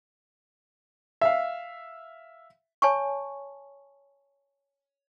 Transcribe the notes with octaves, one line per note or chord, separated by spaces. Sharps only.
E5 F5
C#5 G#5 A5 C#6